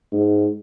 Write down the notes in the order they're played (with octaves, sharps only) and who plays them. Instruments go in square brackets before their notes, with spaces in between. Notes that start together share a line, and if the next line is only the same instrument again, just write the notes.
[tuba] G#2